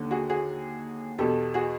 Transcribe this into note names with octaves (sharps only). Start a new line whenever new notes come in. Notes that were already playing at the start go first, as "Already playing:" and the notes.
Already playing: D#2 D3
F#4 G#4
F#4 G#4
E2 B2 G4 A4
F#4 G#4